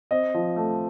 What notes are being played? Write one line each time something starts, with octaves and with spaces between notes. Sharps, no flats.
C4 D#5
F3
A3